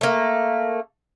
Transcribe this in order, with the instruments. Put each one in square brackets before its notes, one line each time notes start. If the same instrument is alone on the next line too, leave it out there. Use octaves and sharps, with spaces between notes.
[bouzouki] A3 A#3